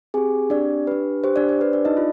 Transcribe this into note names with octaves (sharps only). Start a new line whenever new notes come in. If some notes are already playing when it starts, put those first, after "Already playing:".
C4 G4 G#4 G#5
C4 D4 G4 D5
D4 G4 B4
D4 G4 C5
D4 D5
C5
D4 G4 B4
D4 D5
D#4 D#5
D4 F4